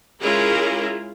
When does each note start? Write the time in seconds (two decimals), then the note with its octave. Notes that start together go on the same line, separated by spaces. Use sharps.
0.22 G#3 C#4 E4 F4 G#4 A#4